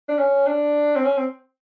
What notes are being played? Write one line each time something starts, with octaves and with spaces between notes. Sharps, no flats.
D4
C#4
D4
C4
C#4
C4